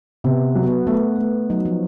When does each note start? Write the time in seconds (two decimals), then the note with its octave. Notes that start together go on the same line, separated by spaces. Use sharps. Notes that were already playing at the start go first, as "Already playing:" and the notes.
0.24 C3 B3
0.55 F#3
0.66 B3
0.87 A3 B3
1.19 A3
1.50 F#3 D#4
1.65 F3